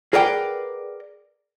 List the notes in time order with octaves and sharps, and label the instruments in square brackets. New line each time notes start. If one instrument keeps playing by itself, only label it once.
[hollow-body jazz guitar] G#4 A#4 B4 D5 F#5 G5